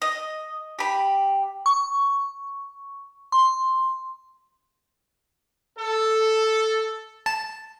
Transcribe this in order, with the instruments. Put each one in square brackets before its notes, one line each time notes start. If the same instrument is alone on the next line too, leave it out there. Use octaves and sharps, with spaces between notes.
[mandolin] D#5
G4 B5
[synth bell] C#6
C6
[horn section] A4
[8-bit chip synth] A5